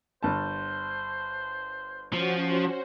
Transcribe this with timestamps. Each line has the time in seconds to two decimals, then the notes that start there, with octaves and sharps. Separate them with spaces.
0.23 G1 C5 A5
2.13 F3 C#4 F#4 C5